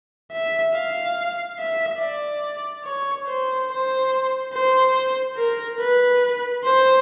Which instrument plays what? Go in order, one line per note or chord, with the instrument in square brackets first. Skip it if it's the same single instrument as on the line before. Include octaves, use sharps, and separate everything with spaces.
[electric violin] E5
F5
E5
D5
C#5
C5
C5
C5
A#4
B4
C5